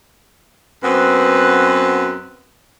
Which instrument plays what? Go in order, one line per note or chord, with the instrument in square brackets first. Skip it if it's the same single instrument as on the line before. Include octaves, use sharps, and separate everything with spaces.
[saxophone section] F#2 B3 C4 B4